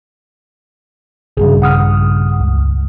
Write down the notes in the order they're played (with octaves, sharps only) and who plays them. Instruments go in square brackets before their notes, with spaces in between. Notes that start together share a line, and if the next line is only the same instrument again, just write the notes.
[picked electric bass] A#1 G2 C#3 [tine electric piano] G#4
[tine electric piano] F#5 D#6 F6
C#2